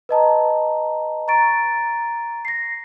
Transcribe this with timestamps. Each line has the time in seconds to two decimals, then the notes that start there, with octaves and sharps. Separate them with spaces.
0.09 B4 D#5 A5 A#5
1.28 A#5 C#6 A6 D7
2.45 A#6 C7